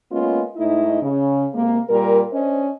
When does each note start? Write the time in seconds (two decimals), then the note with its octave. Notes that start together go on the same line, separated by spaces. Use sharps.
0.11 G#3 A#3 B3 C#4 F4
0.57 G#2 A3 D#4 E4 D#5
1.02 C#3
1.53 C3 G#3 A#3
1.89 A#2 G3 A#4
2.32 C#4 D4 C5 D#5